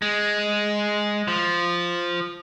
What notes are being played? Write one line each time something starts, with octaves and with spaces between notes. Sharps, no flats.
G#3
F3